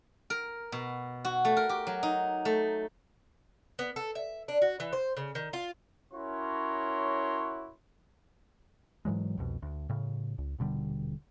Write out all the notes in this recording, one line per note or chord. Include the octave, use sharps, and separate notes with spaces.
A#4
B2
F#4
A3
A#4
G4
F#3
D#4
A3
B3
A4
E5
D4
F#4
E3
C5
C#3
D#3
F4
C#4 E4 F#4 A#4 C#5 C6
G#2 E3 F#3 G#3
C2 F2 B2
D2
A2 C#3
C#2
D#1 B2 D3 G3